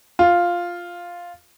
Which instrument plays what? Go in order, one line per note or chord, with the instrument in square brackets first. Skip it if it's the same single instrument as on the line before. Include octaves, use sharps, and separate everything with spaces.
[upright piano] F4